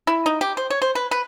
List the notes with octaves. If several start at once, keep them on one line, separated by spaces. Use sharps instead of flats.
E4
D#4
G4
C5
C#5
C5
B4
B4